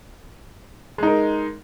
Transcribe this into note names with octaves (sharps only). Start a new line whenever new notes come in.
G#3 D#4 A#4